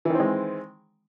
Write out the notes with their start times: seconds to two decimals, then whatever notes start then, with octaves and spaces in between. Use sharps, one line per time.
0.05 E3
0.10 D#3
0.15 C4
0.20 G#3